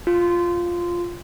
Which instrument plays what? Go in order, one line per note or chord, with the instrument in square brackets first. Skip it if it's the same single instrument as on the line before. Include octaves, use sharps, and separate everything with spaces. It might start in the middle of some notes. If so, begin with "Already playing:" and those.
[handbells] F4